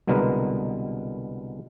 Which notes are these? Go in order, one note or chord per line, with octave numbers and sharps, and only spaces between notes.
C2 B2 D3 G#3 A#4 B4